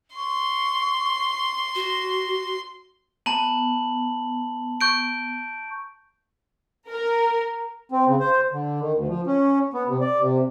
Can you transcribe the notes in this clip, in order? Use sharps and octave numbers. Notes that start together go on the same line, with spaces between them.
C6 C#6
F#4
B3 A5 A#5 F#7
C#6 G6 D7
A#4
C4
C#3
C5
D3
D#3
D2
F3
C#4
B3
C3
D5
C3